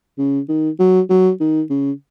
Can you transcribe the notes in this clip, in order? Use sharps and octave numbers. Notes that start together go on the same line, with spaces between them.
C#3
D#3
F#3
F#3
D#3
C#3